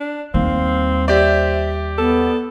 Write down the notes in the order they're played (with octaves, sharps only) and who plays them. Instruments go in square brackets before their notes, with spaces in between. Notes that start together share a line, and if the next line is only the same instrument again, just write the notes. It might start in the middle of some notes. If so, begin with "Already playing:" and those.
[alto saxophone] D4
[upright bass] D#2 G3 [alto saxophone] C4 [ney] F5
[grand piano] G4 D5 [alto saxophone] C5 [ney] E5
[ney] B3 [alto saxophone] A4